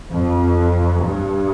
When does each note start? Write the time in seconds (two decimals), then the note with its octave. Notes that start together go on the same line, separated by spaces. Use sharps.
0.11 F2
1.04 G2